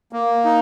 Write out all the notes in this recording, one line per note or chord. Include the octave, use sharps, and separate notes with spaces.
A#3
D#4